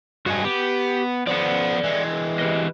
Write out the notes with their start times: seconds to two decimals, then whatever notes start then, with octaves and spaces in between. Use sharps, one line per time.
0.26 G2 G#3 F#4 G#5
0.44 B3 G4
1.27 F3 B3 D5 F#5
1.84 E3 G#3
2.39 G4 B4 D#5